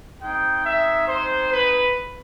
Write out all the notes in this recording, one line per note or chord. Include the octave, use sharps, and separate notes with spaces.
G#3 C4 D#4 G5
E5
C5
B4